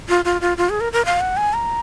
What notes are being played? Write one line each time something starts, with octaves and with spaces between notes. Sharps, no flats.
F4
F4
F4
F4
G#4
A#4
A#4
F5
F#5
G#5
A#5